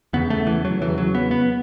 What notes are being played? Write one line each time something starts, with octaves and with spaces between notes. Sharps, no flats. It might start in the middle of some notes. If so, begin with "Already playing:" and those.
E2 C#3 B3
A3
E3
F#3
E2 C#3 E3
F#3
B3
B3